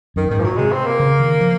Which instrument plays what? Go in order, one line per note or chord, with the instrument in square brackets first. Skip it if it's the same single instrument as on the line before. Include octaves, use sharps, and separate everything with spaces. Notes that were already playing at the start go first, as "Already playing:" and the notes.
[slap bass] F#2 [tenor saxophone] D#3
[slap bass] G#2 [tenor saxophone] D#3
[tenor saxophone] F3
[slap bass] A#2 [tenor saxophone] F#3
[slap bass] C3 [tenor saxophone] G#3
[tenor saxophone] C4
A#3
[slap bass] C#3
D#3
F3